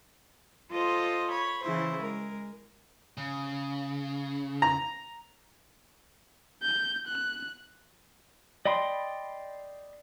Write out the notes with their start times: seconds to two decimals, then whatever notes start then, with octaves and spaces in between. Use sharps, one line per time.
0.71 F4 A4 C5 D#5
1.30 C#5 B5
1.63 C#3 E3 E4 C5
2.01 G#3 A#4
3.17 C#3
4.62 A#5
6.62 G6
7.07 F#6
8.65 D5 D#5 G5 B5 C6